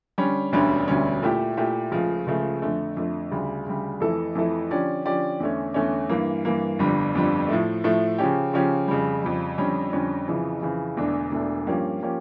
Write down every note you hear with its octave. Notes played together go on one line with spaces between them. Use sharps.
D3 G3 C#4
E1 D2 D3 G3 C#4
E1 D2 D3 G3 C#4
A#2 A3 E4 G4
A#2 A3 E4 G4
C#2 C#3 F3 A3
C#2 C#3 F3 A3
F2 D3 A3
F2 D3 A3
D2 C#3 G3
D2 C#3 G3
F2 E3 A3 E4 A4
F2 E3 A3 E4 A4
D3 F3 C#4 G4 D5
D3 F3 C#4 G4 D5
E2 D3 A3 C#4
E2 D3 A3 C#4
G2 E3 A#3
G2 E3 A#3
G1 F2 D3 G3
G1 F2 D3 G3
A2 F3 A3
A2 F3 A3
C#3 F3 C#4 G4
C#3 F3 C#4 G4
F2 C#3 G3
F2 C#3 G3
F2 D3 G3 C#4
F2 D3 G3 C#4
F2 C#3 E3
F2 C#3 E3
E1 E2 D3 A3 D4
E1 E2 D3 A3 D4
G2 F3 A#3 C#4 G4
F3 A#3 C#4 G4